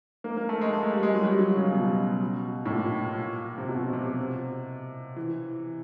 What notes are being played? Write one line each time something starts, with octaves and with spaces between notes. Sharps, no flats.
A#3
A#3
A3
G#3
A3
G#3
G3
G#3
F#3
G3
F#3
C#3
B2
A2
A#2
C3
B2
C3
E3